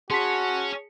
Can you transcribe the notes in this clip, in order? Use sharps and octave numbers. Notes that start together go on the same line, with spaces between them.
C#4 F#4 G#4 A5 C6 B6